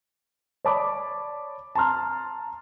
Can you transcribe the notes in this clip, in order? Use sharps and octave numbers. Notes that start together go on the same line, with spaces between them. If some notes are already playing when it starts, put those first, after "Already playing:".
C#5 D5 A5 B5 D6 D#6
A5 A#5 C6 F6